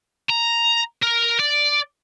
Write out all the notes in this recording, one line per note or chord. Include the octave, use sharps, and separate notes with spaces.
A#5
A#4
D5